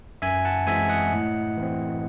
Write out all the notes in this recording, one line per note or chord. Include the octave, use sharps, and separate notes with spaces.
F#2 E5 G#5
F#5 A5
E3 G#3 C4 E5 G#5
D#5 F#5
A2
E3 C4